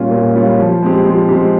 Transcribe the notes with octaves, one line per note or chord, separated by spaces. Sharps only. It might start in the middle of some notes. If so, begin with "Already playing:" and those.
Already playing: A#2 G3 C#4 F4
A#2
G3 C#4 F4
F3
G#3 C4 G4
F3
G#3 C4 G4